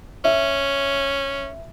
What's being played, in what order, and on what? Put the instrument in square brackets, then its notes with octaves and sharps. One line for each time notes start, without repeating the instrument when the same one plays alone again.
[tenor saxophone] C#4 [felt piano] E5